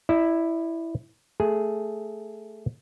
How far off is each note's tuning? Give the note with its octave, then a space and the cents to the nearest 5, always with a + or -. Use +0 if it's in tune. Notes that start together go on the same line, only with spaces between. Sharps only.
E4 +0 D5 +45
A3 +0 G#4 +0